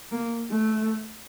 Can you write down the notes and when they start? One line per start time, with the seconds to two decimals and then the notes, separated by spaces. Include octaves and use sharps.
0.11 A#3
0.50 A3